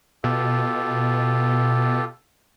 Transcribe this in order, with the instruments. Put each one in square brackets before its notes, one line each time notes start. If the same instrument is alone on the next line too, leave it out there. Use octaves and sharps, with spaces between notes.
[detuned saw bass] B2 [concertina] F4 G4 A4